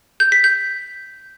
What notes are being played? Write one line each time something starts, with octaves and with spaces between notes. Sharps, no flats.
G6
B6
G6